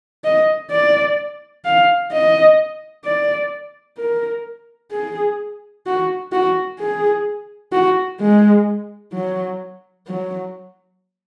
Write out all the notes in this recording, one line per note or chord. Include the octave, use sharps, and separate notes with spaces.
D#5
D5
F5
D#5
D5
A#4
G#4
F#4
F#4
G#4
F#4
G#3
F#3
F#3